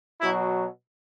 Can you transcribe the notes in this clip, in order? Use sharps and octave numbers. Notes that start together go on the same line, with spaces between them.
B2 F#3 E4